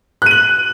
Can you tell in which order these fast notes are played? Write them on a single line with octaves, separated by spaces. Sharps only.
F#6 D#7 F#7